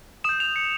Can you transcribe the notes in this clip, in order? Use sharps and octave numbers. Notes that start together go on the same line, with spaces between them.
D#6 G6 E7
F7
C#7